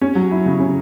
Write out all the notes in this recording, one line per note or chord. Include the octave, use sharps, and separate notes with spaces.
C#4
F#3
E4
C#3
C#4